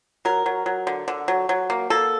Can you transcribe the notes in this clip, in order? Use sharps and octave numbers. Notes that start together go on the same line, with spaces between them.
F#3 A#4
F#3
F#3
D3
D3
F#3
F#3
A#3
A#3 A4